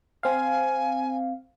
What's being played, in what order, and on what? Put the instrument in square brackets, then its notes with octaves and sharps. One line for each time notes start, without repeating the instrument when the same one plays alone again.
[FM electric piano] C4 F5 [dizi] G#5